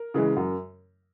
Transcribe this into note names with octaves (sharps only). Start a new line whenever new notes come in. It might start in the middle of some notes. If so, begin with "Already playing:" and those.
Already playing: A#4
C#3 E3 G#3
F#2